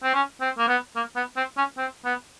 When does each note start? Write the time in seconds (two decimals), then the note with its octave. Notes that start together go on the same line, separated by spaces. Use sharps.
0.03 C4
0.14 C#4
0.41 C4
0.59 A#3
0.69 B3
0.96 A#3
1.16 B3
1.37 C4
1.57 C#4
1.78 C4
2.05 B3